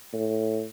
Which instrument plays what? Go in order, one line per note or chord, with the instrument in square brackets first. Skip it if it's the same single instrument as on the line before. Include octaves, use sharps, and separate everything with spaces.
[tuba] A2